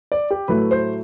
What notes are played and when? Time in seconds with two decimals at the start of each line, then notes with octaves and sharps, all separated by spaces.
0.12 D5
0.31 G4
0.48 A2 F#3 A3 E4 B4
0.71 C5